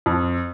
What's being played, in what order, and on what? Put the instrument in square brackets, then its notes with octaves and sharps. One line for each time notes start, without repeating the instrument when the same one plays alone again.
[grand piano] F2